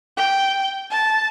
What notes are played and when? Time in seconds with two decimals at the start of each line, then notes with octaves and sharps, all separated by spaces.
0.17 G5
0.91 A5